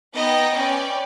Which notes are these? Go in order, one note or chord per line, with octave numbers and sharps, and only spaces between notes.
B3 D#4 D#5 G5 A#5 A#6
C#4 B4 D5 G5 G#5